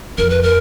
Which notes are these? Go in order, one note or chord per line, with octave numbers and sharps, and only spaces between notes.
F2 A#4
B4
A#4